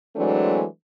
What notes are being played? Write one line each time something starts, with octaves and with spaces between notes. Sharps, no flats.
E3 F#3 G#3 A3 C4 D4